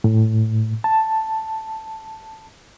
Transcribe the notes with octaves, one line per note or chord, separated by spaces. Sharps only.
A2
A5